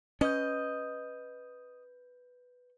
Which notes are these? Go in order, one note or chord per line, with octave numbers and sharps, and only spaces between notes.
C#4 B4 D#5 G6